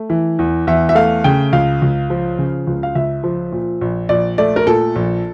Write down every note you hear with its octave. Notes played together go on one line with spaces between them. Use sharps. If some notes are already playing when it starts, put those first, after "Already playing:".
Already playing: A3
E3
E2
E2 E5
E5
A3 F5
C#3 G5
C#2 F5
C#2
F3
C#3
C#2
F5
C#2 E5
F3
A#2
A#1
A#1 D5
A3 D5
A#4
A#2 A4
A#1